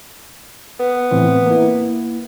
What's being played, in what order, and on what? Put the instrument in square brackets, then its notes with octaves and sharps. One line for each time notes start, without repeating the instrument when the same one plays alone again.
[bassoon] B3
[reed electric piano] A2 E3 C4
A#3 E4